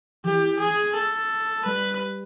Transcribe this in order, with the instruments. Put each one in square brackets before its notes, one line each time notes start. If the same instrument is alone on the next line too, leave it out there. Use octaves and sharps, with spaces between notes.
[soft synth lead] E3 [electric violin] G4
[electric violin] G#4
A4
[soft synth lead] G3 [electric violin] B4